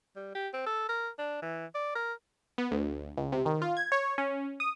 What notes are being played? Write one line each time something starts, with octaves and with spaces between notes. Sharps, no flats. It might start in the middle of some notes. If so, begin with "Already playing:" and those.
G3
G4
C4
A4
A#4
D4
E3
D5
A#4
B3
D2
C#2
C3
D#3
F4
G#6
C#5
C#4
D#6